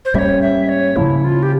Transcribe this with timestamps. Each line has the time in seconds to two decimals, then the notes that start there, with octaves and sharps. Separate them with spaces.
0.05 C5
0.14 G#2 G3 A#3 C#4 C#5 E5
0.42 E5
0.69 C#5
0.96 C#3 F3 A#3 E4
1.24 F4
1.43 G4